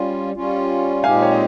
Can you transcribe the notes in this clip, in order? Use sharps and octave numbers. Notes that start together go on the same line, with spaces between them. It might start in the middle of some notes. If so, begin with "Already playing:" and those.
Already playing: G3 C#4 F4
G3 C#4 F4
A#2 G#3 C4 D#4 G4 F5 G#5
C#5
D#5